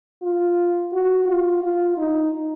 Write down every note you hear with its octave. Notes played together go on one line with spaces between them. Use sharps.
F4
F#4
F4
F4
D#4